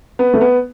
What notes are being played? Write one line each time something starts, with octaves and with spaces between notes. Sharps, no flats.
B3
A3
B3